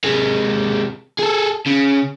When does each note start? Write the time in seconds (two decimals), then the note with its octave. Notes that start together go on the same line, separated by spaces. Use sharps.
0.04 C3 G#3
1.19 G#4 A4
1.67 C#3